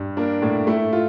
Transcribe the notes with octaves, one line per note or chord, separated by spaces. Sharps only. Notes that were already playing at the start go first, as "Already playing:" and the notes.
Already playing: G2
A#3 D4
A2
A3 E4
F4